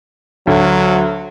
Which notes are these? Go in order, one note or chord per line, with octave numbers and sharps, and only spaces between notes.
D2 F#3